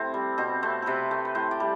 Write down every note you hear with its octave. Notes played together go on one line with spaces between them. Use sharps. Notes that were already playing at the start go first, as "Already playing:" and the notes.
Already playing: A2 C3 C4 E4 A4
G3
B2 C4
A3 C4
C3 A4 B4
A3
B4
A2 C5
D5
G3